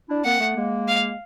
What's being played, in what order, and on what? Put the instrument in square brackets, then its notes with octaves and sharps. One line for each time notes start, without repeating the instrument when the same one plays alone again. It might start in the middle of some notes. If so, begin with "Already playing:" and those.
[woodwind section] D4 E4
[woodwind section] A#3 C4 [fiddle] F#5
[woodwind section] A3 B3
G#3 A#3
[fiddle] F5